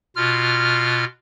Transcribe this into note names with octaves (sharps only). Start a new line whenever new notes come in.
B2 F4 F6